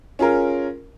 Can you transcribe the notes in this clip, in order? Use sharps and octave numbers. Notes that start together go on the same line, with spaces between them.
C#4 F4 G#4 A#4